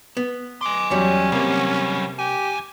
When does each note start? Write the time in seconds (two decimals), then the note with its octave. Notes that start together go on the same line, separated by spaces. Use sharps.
0.17 B3
0.61 G#5 C6 D6
0.91 E2 F#3 G3 C#4
1.32 C3 F#3 G3 A#3
2.19 F2 G4 G#5